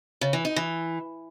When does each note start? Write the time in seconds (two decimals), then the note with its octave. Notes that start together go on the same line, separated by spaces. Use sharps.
0.21 C#3
0.33 E3
0.45 D#4
0.56 E3